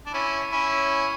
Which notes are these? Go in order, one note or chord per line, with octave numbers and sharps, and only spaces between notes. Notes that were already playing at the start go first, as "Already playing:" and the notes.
D4
C#4 E4
C#4 E4